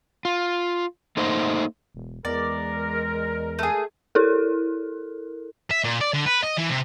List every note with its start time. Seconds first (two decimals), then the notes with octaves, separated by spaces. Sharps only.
0.25 F4
1.17 A3 A#3 D#4 C5
1.95 E1
2.25 E2 G#3 A#4 D5
3.59 A3 G#4
4.15 E4 A4 A#4
5.71 E5
5.84 A#2
6.01 D5
6.14 D3
6.26 B4
6.43 D#5
6.57 E3
6.70 C3